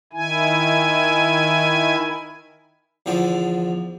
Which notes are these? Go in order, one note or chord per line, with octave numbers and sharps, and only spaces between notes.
D#3 E4 G#5
E2 D3 F3 D5